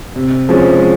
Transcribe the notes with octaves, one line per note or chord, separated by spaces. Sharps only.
C3
F3 G#3 C#4